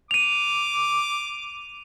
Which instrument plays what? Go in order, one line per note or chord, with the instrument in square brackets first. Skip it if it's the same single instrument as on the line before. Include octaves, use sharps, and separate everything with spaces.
[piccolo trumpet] D6 [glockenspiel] D#7 F7